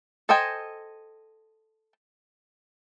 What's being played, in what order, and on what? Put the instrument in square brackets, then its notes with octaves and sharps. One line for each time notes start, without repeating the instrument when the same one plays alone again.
[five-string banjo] A4 C5 D#5 G5 G#5